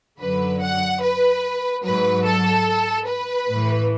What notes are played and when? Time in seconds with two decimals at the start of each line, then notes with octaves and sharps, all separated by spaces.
0.19 F#2 D3 F#3 B4
0.61 F#5
1.02 B4
1.83 G#2 F#3 B4
2.25 A4
3.07 B4
3.48 A2 E3